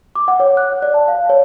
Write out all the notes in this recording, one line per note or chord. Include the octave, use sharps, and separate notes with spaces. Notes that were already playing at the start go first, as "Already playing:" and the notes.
D6
F#5
C#5
F#6
D5
A5
F5
C#5